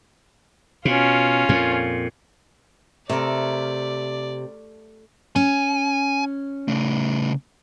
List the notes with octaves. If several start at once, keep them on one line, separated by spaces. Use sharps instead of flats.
B2 C#4 F4
F2 A#2
C3 A3 A#4 D5
C#4 G#5
C#3 A3